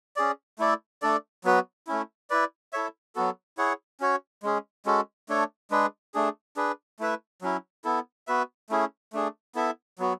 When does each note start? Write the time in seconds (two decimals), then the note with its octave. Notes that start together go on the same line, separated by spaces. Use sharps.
0.16 C#4 G#4 D5
0.59 A3 E4 A4 D5
1.02 A3 D4 A4 D5
1.44 F#3 B3 F#4 B4
1.87 A3 C#4 E4
2.30 E4 B4 D5
2.73 E4 A4 C#5 E5
3.15 F#3 B3 F#4 A4
3.58 E4 G#4 C#5 F#5
4.00 C#4 F#4 C#5
4.43 G#3 C#4 G#4
4.86 G#3 C#4 F#4 A4
5.29 A3 D4 A4 C#5
5.71 G#3 D4 G#4 B4
6.14 A3 D4 G#4
6.57 D4 G#4 B4
6.99 A3 E4 B4 E5
7.42 F#3 C#4 E4
7.84 B3 E4 A4
8.27 B3 F#4 B4 E5
8.70 A3 C#4 E4 G#4
9.13 A3 D4 G#4
9.55 B3 E4 A4 E5
9.99 F#3 B3 F#4